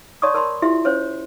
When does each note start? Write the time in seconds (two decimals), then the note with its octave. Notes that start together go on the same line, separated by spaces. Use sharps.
0.22 C#5 D5 A5 C6 C#6 D#6
0.34 A#4 A5 B5 C6
0.62 E4 F4 G4 E5 C6
0.85 C#4 C5 C#5